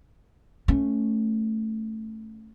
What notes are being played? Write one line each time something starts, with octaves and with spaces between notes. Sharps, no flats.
A3 C#4